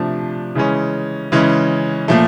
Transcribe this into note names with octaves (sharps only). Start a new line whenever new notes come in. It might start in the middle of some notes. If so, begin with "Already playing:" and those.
Already playing: C3 F3 A3 D4
C#3 E3 G#3 C#4
C#3 E3 G#3 C#4
A#2 F3 A3